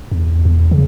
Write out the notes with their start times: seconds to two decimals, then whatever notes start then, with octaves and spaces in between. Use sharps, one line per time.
0.12 E2
0.45 E2
0.71 C#3